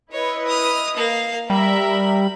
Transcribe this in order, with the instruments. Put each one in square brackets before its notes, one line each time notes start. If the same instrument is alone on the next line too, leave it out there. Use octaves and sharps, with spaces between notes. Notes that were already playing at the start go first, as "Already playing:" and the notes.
[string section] E4 B4 D#5 [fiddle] C#5
[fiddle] D#6 F6
A#3 F5
[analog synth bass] G3 [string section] A#4 E5 [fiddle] B5